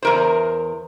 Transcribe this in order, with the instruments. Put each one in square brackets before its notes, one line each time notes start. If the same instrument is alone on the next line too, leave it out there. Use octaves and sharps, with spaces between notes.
[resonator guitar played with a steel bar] E2 A#4 C5